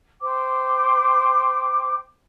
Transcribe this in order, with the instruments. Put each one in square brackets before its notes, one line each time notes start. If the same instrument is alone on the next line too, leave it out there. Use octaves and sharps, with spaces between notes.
[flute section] C5 G5 D6